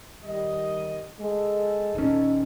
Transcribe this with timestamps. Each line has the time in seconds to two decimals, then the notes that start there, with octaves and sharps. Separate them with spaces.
0.24 D#3 G3 D#5
1.19 G#3 A4
1.95 D#1 C#4 D#4